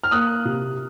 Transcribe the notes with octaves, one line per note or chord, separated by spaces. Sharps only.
F6
A#3 D#6 F#6
C3